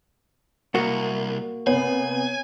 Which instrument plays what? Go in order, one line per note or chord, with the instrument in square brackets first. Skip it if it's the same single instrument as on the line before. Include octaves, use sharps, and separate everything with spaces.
[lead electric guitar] C2 [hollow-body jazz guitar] A#3 F#4
[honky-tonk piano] C3 B3 [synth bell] C#5 [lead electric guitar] G#5